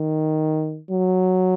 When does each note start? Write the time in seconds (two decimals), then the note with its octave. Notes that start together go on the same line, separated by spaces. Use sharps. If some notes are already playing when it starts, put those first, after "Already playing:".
Already playing: D#3
0.90 F#3